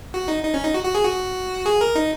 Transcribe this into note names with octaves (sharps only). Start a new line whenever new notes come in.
F#4
D#4
D#4
C#4
D#4
F#4
F#4
G#4
F#4
G#4
A#4
D#4